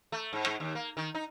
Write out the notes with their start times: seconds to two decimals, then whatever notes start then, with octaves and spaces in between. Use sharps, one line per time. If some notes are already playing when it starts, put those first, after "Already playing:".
0.12 A3
0.33 G#2
0.46 G#2
0.60 D#2
0.75 A#3
0.97 D#3
1.15 D#4